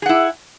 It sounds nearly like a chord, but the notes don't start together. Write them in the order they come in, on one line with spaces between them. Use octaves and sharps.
G#4 F#5 E4